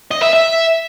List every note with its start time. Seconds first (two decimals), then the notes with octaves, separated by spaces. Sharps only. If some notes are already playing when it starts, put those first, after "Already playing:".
0.11 D#5
0.22 E5
0.33 E5